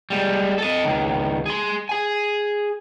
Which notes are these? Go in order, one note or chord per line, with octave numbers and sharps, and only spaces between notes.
G3 G#3
A4 D#5
C#2 D#3
G#4 C6
G#4 G#5